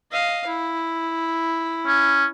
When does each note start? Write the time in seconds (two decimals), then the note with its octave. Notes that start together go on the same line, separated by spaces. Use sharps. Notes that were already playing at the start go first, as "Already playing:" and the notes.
0.12 D#5 F5
0.46 E4
1.87 C#4